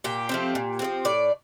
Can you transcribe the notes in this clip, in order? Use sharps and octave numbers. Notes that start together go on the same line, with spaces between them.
A#2 G4
F3 A3 C4
A#2
A3 C4
F3
A2 D5